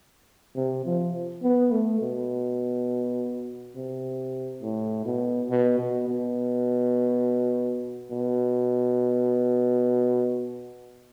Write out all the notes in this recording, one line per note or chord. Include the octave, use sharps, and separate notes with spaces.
C3
F3
B3
A3
B2
C3
A2
B2
B2
B2
B2
B2